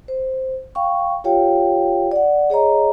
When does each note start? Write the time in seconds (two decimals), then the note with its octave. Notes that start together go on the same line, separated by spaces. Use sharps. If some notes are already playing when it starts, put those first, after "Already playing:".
0.08 C5
0.75 F5 G5 C#6
1.24 F4 G4 C#5 F5 G5
2.11 D5 F#5
2.50 G#4 C#5 D#5 A#5